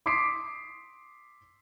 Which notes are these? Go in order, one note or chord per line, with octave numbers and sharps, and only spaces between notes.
C6 D6 D#6 B6 C7 D7